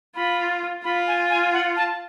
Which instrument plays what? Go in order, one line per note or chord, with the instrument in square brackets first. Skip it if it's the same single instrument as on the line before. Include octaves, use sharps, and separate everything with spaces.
[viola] F4 [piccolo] B5
[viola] F4 [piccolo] B5
[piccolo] G#5
G#5
F#5
A5